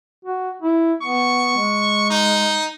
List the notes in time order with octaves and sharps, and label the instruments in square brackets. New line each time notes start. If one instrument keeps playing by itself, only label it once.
[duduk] F#4
E4
[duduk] B3 [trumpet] C#6
[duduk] G#3
[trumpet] D#4